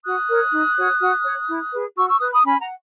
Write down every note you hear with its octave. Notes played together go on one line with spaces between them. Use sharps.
F#4 D#6 F#6
A#4 C#5
D#4
F#4 C#5
F#4
C#5
E4
G#4 B4
F#4 C#6 E6
C#6 E6
B4 D#6 F#6
B5 D#6
C#4 G#5 B5
F#5 A#5